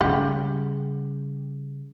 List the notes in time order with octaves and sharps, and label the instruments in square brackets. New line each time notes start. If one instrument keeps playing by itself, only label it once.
[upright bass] C#3 G3 [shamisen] G4 F#5